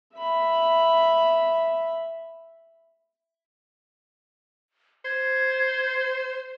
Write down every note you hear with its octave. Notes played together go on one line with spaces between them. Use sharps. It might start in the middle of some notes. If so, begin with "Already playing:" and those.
E5 B5
C5 G#6